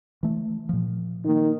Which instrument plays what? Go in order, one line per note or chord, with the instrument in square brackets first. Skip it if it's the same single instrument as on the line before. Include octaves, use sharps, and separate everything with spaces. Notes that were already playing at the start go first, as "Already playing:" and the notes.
[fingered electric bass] E3 A3
A#2 F3
[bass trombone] D#3 [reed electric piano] A#3 D#4